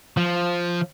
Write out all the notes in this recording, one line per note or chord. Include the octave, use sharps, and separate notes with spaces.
F3